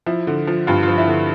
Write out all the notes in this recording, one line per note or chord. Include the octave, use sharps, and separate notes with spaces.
F3 E4
D3
F3
G2 F4
F4
F3
E4
D3